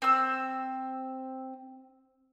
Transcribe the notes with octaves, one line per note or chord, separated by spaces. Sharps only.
C4 E6